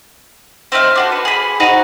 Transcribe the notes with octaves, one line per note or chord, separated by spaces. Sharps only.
C4 D#4 E5 F5
D4 F#4 A4
B4
G#4 B5
D#4 F#4 C5 D#5